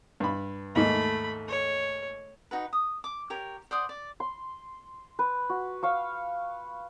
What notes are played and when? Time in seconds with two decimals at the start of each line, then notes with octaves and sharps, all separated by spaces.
0.20 G2 B5
0.75 D#2 G#2 A3 B5
1.48 C#5
2.51 D#4 F#4 B4
2.73 D#6
3.04 D6
3.30 G4 A#4 C#5
3.71 C5 D5 F#5 D#6
3.89 D5
4.20 C6
5.19 B4
5.50 F#4
5.83 F5 C#6 E6